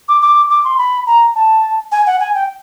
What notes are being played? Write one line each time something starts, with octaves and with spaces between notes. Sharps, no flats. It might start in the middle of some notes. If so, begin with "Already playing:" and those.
D6
D6
D6
C6
B5
A#5
A5
G#5
F#5
G#5
G5